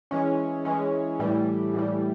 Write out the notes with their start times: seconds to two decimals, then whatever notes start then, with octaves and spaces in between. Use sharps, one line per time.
0.11 E3 G#3 C#4
0.65 E3 G#3 C#4
1.19 A2 E3 G3
1.74 A2 E3 G3